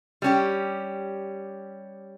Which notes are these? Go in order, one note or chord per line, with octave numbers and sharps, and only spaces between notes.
G3 C#4 G4